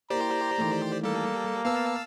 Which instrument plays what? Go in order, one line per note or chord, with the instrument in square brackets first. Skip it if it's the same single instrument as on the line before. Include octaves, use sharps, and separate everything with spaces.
[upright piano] A#3 E4 [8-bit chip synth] G4 C5 D5 [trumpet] A#5
[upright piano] D#3 E3 A3
[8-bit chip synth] G3 A4 [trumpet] A#3
[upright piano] B3 [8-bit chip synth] F5 A5 E6